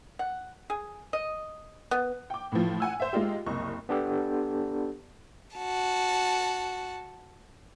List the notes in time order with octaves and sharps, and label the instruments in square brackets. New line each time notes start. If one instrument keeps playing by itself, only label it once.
[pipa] F#5
G#4
D#5
B3
[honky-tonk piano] G5 D6
A2 E3 F3
F#5 G#5 E6
C5 E5
G#3 D#4 F4 G4
F#1 C2 D#5 C#6
[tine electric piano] B3 D4 G4 A4
[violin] F#4 A5